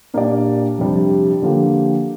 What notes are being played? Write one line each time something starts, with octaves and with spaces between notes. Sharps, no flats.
A#2 A#3 D4 G4 D5
F2 C3 G3 D4
D3 F3 A#3 G4